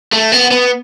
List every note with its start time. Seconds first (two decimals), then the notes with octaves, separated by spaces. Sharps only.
0.12 A3
0.32 B3
0.51 B3